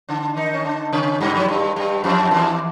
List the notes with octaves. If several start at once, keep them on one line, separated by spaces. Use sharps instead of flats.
D3 D4
D#3 D#4
C#4
D3 D4
C#3 C#4
G2 G3
F#3
G2 G3
G2 G3
F2 F3
E2 E3